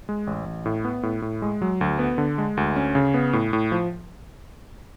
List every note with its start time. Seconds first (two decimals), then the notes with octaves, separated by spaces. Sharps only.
0.09 G#3
0.27 A1
0.46 A1
0.66 A2
0.85 B3
1.03 A2
1.22 A2
1.42 G#3
1.62 F#3
1.81 D2
1.99 B3
2.18 D3
2.38 G#3
2.57 D2
2.76 C#4
2.95 C#3
3.14 B3
3.33 A2
3.53 A2
3.72 F3